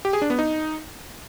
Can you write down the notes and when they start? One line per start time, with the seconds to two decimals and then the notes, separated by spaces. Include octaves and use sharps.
0.05 G4
0.13 G#4
0.22 D4
0.30 B3
0.39 D#4